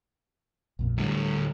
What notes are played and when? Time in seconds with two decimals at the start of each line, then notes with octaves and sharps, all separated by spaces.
0.79 A#1 F2 A#2
0.98 D2 A2 G3